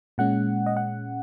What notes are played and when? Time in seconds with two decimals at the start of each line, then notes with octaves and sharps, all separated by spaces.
0.18 A#2 G#3 C#4 F#5
0.66 D#5
0.77 F#5